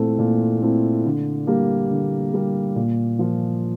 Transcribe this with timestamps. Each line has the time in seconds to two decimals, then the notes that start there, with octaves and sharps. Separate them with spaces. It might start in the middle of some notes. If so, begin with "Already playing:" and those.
Already playing: A#2 A3 C4 E4
0.19 A#2
0.62 A3 C4 E4
1.05 D3
1.47 G3 A#3
1.91 D3
2.34 G3 A#3
2.76 A#2
3.19 F3 A#3 F4